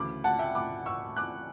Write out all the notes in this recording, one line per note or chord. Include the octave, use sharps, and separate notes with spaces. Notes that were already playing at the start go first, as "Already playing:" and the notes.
Already playing: D2 C#3 E3 B5 D6
F#5 A5
E5 G5
B5 D6
C#6 E6
D6 F#6